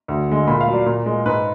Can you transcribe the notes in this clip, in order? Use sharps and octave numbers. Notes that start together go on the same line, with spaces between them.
D2
D3 G#3
A#2 B5
F5
F#3
D5
A#2
G#3
G#2 B4